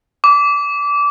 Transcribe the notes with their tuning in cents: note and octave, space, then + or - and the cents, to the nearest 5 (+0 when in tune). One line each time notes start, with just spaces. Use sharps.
D6 -25